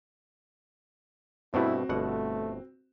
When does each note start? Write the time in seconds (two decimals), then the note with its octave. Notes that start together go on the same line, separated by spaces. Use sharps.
1.54 G2 B2 A3 C4 E4 F#4
1.89 G1 B2 A3 F#5